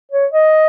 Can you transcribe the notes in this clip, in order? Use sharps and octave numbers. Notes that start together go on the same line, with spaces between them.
C#5
D#5